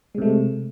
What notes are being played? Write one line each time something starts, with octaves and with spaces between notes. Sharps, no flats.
C3 G#3 A3